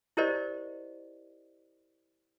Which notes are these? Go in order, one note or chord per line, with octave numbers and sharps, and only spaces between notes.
E4 G4 A#4 C5 D5 D#5